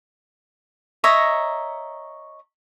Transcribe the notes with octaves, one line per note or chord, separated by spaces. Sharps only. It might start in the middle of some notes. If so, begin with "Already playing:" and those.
C#5 D#5 E5 A#5